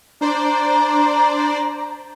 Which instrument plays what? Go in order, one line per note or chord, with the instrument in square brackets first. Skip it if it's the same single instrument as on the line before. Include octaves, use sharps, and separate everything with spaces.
[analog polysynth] D4 C5 D5 [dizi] A#5